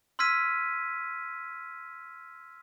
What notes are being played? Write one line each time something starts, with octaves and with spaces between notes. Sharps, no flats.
C6 E6 F6 G#6 B6 D#7